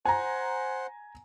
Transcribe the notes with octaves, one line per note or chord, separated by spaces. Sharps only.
C5 F#5 G#5 A#5